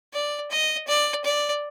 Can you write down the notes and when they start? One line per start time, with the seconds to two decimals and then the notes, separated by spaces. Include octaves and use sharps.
0.13 D5
0.51 D#5
0.88 D5
1.24 D5